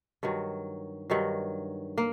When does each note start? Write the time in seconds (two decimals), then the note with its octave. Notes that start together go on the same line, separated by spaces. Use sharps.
0.23 G2 D#3 F#3
1.10 G2 D#3 F#3
1.98 A#3